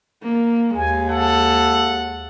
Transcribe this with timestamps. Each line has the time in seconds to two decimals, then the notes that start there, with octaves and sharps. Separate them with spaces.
0.23 A#3
0.76 D#2 G#3 G#5
1.10 A4 F#5